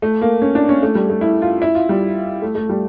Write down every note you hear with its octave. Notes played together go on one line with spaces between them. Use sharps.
A3
A#3
C#4
D4
C#4
A3
G3
A3
E4
F4
E4
F4
G3
A3
A3
G3